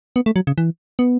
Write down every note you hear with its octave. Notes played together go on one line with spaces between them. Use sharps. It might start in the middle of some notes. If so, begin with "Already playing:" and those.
B3
A3
F#3
C#3
E3
B3